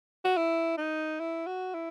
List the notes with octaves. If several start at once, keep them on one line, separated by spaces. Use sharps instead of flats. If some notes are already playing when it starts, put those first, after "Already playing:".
F#4
E4
D#4
E4
F#4
E4